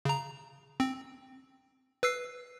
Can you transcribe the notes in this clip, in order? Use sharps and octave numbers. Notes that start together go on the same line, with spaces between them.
C#3 A#5
C4
B4 E6 C7